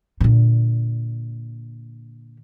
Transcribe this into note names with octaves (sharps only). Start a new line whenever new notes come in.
A#2 D3